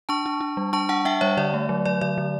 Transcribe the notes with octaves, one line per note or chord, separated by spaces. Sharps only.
D4 A5 C#6
D4
D4
G3
D4 A5 C#6
D4 F#5 A5
D4 E5 G5
G3 C#5 E5
D3 D5
A3
F#3
F#3 D5
D3 D5
D3